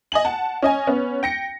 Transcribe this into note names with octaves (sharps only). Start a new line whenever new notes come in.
D#5 G#5 F#7
F#5 A5
C#4 D#5 G#5
B3 C#4
G5 A#6 C#7